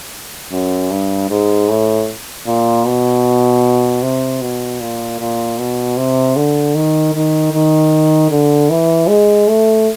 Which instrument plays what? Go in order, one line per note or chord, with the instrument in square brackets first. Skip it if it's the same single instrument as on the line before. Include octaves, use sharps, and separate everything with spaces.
[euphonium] F#2
G2
G#2
A2
A#2
B2
C3
B2
A#2
A#2
B2
C3
D3
D#3
D#3
D#3
D3
E3
G#3
A3